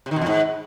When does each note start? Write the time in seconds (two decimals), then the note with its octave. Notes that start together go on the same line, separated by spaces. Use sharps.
0.06 C3
0.11 D#3
0.16 B2
0.21 E2
0.26 G#2